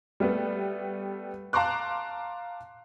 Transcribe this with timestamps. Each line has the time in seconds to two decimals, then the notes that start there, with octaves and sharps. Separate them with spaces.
0.20 G3 A3 B3
1.53 F5 A5 A#5 C6 D6 F#6